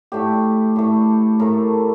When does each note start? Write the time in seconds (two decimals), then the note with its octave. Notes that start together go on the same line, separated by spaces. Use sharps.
0.12 A2 A3 G4
0.76 A2 A3
1.40 A2 A3 A#4